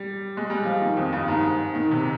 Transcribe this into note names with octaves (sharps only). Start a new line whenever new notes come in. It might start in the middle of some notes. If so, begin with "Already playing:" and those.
Already playing: G3
G#3
G3
F3
D#3
F2
G2
G#2
D#3
C3